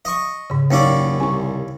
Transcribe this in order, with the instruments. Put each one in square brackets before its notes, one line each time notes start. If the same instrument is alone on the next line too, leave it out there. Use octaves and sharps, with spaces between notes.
[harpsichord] D#5 C#6
[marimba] G#2 C#3
[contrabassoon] F#1 [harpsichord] D#2 C#4 D5
[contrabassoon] C2 [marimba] G#5 C#6